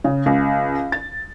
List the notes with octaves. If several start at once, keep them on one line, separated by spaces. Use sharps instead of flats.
C#3
C#2
A6